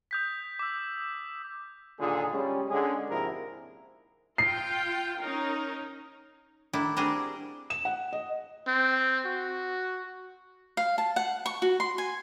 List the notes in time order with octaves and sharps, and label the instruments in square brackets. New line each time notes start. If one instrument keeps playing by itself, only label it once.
[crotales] D#6 G6 B6
D6 E6
[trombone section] D#2 A#2 D3 F4 G#4
G3 G#3 C#4
D3 G#3 C#4 G#4
A#1 G#2 C3 F3 E4 A#4
[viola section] F4 G5 [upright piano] C7
[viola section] C#4 D#4 A#4
[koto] D#3 A3 D4 E4
G3 C4 D4 F#4 G#4 A#4
[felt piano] E7
F#5
D#5
[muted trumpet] C4
F#4
[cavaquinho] F5
A5
F#5
C#6
F#4
C6
G#5